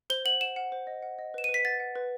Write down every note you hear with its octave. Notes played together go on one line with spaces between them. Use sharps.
C5 G7
F#5 F#7
F#5 E7
F#5
C5
D#5
F#5
D#5
B4 E7
D#7
B4
B6
F#5 A6
F#5
B4